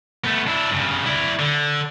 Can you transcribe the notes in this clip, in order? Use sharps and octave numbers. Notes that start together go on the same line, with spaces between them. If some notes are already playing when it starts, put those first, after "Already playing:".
A3 B3
D4 E4
G2 C#3
E4 D5
D3